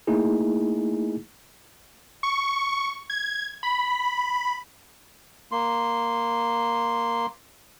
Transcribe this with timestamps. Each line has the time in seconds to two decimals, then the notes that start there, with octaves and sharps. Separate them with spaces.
0.07 A3 A#3 D#4 E4 G#4
2.23 C#6
3.10 G#6
3.63 B5
5.52 A#3 C6